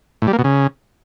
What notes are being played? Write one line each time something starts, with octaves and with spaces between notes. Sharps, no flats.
A2
G3
A#3
B2
C#3